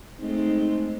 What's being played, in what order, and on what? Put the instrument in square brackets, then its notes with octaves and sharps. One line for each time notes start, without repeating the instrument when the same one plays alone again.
[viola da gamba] G#3 A3 C4 [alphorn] D#4